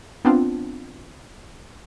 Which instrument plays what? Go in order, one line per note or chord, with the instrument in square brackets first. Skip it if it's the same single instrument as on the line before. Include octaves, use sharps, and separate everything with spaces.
[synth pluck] B3 C4 D4 F4